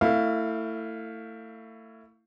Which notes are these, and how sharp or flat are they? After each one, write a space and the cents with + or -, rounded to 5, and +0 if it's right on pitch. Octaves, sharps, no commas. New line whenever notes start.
A3 +30 E4 +5 F5 +0